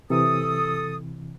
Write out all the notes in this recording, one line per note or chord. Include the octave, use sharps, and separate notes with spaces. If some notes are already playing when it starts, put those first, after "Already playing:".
C3 E3 A4 D#6